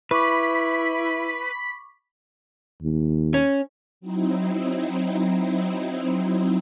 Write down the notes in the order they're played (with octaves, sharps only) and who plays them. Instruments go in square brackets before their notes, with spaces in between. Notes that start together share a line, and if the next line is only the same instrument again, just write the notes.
[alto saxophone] E4 [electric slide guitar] B4 [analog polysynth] B5 B6 [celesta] C#6 D6
[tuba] D#2
[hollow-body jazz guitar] C#4
[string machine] F#3 C4 D#4 E4